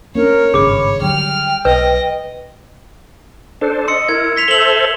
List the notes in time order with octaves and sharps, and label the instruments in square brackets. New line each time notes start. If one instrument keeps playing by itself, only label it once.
[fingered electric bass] A#3 C#4 D4 [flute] A#4 [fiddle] C#5
[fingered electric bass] G#1 G2 C#3 [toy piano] G#4 D6 [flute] B5
[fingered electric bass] D3 F#3 G3 [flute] G5 [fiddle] F6
[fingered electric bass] B1 [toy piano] B4 [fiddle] D#5
[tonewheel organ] D4 A4 C5
[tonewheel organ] D#5 [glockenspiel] C6 E6 C#7
[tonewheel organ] E4 A#4 [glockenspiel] G#6
[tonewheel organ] C6 [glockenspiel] G#6 B6 F7
[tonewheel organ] A4 C5 E5 [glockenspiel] F#7 G7